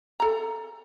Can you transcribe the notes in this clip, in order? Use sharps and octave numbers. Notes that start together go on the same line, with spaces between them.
A4 A#5